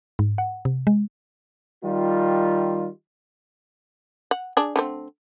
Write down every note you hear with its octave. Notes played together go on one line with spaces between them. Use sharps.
G#2
F#5
C3
G#3
D#3 G3 F4
F#5
D4 G#4
D3 A3 C4